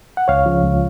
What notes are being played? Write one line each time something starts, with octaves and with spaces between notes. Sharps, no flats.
F#5
C#2 C#5 F5
C#3 F3
C#2